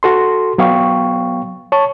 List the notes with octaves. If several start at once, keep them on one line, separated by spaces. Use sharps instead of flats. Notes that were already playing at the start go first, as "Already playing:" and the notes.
F#4 A4 C6
F#3 B3 F5 G5 C#6
C#5 A5 C#6